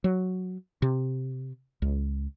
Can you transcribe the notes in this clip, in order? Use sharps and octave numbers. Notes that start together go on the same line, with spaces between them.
F#3
C3
C#2